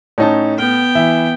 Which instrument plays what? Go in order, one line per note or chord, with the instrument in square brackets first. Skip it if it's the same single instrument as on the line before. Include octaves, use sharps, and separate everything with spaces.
[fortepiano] A2 [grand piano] C#4 D#4 A5
[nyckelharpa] B3 G5 [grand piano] F6
[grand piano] E3 [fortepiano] E5